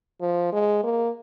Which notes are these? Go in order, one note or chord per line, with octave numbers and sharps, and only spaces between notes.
F3
G#3
A#3